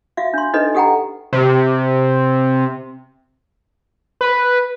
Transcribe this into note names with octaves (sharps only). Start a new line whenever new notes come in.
F#4 E5 F5
D4 C6
D4 D#4 A4 B4 D#5
G4 A4 F#5 G5 A#5
C3
B4